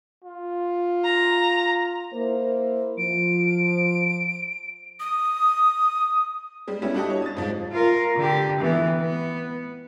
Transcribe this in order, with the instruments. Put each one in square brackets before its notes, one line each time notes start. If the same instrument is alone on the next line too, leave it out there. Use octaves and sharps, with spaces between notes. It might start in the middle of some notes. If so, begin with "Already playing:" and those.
[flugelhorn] F4
[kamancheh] A#5
[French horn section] A#3 E4 C5
[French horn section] F3 [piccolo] D7
[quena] D#6
[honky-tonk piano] G3 G#3
G3 A3 B3 C#4 E4
D4 E4 F#4 G4 D#5 A5
C#5
D#6 A6
G#2 F3
[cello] F4 A#4
D3 G4
E3 B3
B3